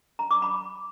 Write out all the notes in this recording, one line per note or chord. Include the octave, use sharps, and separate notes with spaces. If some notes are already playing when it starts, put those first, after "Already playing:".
A#5
D6
B5